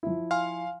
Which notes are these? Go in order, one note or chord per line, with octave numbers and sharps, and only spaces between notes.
F3 E4
F5 G#5 C6 F6